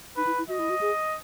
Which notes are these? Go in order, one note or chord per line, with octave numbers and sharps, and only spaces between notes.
D#4 B4
E4
E4
F#4 D#5
E4
F#4
G#4